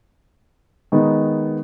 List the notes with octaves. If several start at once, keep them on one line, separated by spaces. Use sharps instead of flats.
D#3 G#3 B3 D#4